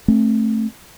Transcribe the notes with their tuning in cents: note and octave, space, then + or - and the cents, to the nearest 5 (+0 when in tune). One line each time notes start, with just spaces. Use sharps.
A3 +0 C4 +35